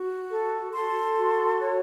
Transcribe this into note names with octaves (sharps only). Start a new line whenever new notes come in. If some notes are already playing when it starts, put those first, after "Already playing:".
Already playing: F#4
A4
A4 C6
F#4
C#5